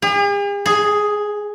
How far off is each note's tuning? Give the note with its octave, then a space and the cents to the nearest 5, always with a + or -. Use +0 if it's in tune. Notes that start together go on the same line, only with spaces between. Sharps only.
G#4 -45
G#4 +5